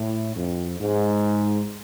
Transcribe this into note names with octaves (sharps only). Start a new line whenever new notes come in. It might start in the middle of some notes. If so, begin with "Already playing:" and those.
Already playing: A2
F2
G#2